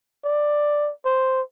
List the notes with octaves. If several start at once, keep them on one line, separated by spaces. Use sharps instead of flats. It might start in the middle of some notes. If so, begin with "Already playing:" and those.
D5
C5